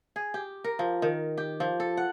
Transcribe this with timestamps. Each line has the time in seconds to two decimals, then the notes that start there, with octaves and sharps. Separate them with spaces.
0.16 G#4
0.34 G4
0.64 A#4
0.79 F3
1.02 D#3
1.37 G4
1.60 F3
1.80 A4
1.97 F#5